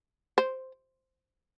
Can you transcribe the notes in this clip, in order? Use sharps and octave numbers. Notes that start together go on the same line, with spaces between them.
C5